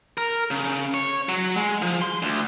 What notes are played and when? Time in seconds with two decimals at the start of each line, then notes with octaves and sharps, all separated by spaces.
0.18 A#4
0.51 C#3
0.94 C#5
1.29 F#3
1.57 G#3
1.82 F3
2.02 C6
2.23 D2